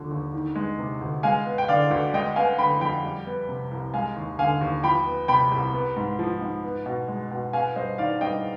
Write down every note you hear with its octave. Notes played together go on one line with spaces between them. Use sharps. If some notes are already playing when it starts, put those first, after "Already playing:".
Already playing: D#2 D3 F3
D#2
D#3
G#3
C3
D2
G#3 F5 G#5
B3
G5
D3 D5 F5
D2
G#3 D#5 G5
B3 F5 G#5
D3 G5 B5
F2 G5 B5
G3
B3
C3
C2
G#3 F5 G#5
D#2
D3 F5 G#5
D#2
F3 G5 B5
B3
C3 G5 B5
C2
B3
G#2
F3
G#2
B3
B2
G#3
B2
B3 F5 G#5
G2 C5 D#5
D#3 D5 F5
G2 D#5 G5